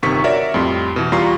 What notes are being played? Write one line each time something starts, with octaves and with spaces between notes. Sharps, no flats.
G1 C3 D#3 C#6 B6
F#4 A#4 C#5 D5 E5
F2 A2 G3 C6
B2 E3
E2 G3 F4 A#5 C#6 C7